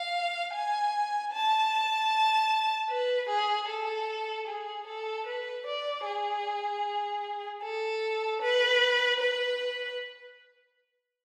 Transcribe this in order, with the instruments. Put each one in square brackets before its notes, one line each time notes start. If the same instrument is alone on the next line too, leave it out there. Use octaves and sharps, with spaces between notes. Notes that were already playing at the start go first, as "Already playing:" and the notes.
Already playing: [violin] F5
G#5
A5
B4
G#4
A4
G#4
A4
B4
D5
G#4
A4
B4
B4